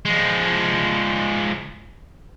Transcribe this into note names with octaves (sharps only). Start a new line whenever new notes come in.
F3 G#3